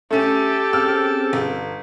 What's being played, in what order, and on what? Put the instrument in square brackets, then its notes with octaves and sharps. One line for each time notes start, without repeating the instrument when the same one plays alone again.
[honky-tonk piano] A3 C#4 [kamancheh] G4 A4
[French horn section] C4 C#4 G#4 [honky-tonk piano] E6 F6
[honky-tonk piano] G1